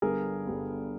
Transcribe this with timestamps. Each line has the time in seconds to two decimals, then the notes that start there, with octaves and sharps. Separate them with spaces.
0.02 G1 G2 D3 G3 B3 G#4 A#4
0.46 G1 G2 D3 G3 B3